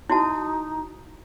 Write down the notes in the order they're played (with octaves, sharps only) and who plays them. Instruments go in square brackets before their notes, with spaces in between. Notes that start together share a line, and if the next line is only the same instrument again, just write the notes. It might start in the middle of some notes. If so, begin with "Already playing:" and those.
[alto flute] D#4 [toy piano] E4 F#4 A5